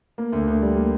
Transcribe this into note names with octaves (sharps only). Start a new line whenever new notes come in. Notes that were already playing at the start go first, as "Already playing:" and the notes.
A#3
D2
D2
G3
A#3